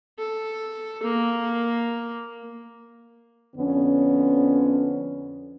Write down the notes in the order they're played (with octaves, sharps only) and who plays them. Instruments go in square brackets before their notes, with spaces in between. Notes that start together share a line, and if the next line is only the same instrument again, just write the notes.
[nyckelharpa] A4
A#3
[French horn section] F2 D3 B3 C#4